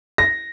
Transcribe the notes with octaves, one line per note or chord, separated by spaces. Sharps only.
A#6